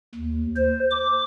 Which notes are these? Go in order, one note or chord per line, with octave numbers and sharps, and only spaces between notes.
D#2
C5
D6